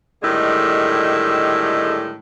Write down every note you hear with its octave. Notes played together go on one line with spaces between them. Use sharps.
A2 D3 D#3 G3 G#3